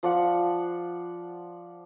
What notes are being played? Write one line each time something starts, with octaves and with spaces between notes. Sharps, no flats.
F3 D5 F#5